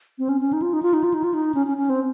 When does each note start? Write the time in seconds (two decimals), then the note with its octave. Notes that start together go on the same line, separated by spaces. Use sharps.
0.18 C4
0.29 C#4
0.41 C#4
0.53 D#4
0.62 F4
0.73 D#4
0.83 F4
0.94 D#4
1.04 F4
1.14 D#4
1.24 F4
1.34 D#4
1.55 C#4
1.67 C#4
1.77 C#4
1.90 C4